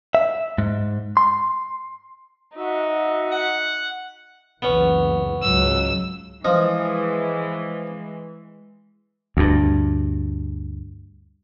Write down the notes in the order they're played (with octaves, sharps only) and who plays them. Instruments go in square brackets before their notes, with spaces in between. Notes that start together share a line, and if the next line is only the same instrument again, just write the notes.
[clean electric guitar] E5
G#2
C6
[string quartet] D#4 [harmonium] F#4 E5
[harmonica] F#5
[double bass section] F#1 C#2 E3 [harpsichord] B3 C#4
[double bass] C#2 F#3 [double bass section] G#2 [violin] E6
[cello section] E3 G#3 [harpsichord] F3 D#5
[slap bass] D2 G2